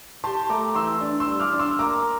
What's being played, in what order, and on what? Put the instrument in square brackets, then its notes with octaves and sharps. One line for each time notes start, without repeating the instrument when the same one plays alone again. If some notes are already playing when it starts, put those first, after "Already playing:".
[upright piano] G4 [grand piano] A5 C6
[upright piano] A3 [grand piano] A#5 D6
[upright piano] E3 [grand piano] C6 E6
[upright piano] D4
[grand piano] C6 E6
[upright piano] G3
[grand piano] D6 F6
[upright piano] D4
[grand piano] C6 E6
[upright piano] A#3 [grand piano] A#5 D6